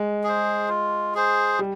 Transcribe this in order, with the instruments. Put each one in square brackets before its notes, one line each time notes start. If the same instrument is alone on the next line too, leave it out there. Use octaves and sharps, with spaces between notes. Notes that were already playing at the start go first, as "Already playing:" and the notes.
Already playing: [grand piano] G#3
[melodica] G#4 C5
F4
G#4 C5
[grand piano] G3